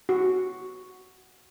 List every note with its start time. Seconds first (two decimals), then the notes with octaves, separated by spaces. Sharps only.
0.09 F#4